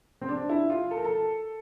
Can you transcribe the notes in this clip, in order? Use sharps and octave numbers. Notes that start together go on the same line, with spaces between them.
C4
D4
E4
F4
A4
A#4
A4